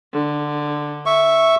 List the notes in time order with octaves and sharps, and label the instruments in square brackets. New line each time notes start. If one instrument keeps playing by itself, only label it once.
[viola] D3
[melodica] E5 C#6